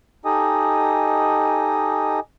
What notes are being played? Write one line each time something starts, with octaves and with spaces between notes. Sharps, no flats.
D#4 G4 A4 D#5 G#5 D#6